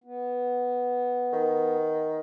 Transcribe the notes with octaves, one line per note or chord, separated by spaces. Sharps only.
B3
D#3